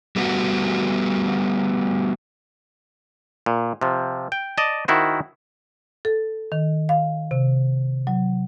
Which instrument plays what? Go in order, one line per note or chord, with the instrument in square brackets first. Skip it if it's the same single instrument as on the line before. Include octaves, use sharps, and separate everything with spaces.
[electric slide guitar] G3 A3 B3 F#4
[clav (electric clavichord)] A#2
C3 F3
G5
D5 D#5 A5
D#3 E4 F#4 C5
[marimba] A4
D#3
F5
C3
F#3